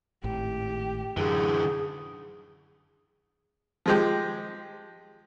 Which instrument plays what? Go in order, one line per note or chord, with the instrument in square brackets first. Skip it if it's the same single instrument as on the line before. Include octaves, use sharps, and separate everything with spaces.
[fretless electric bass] G#1 A2 [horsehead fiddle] G4
[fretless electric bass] F#2 [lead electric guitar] D3 E3 [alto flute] G#4
[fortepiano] F3 G#3 G4